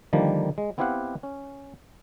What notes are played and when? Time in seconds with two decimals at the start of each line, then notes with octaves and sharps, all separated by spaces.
0.13 D3 D#3 F3 G3 A#3
0.58 G#3
0.78 B3 C4 E4 G4 F5 F#5
1.23 C#4